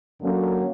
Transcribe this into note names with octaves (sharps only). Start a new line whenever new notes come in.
F#2 D3 F#3 A#3 C#4